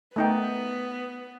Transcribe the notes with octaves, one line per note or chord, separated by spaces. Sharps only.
A3 B3 D#4 G5